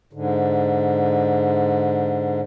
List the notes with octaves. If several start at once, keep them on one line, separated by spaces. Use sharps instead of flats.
G#2 D3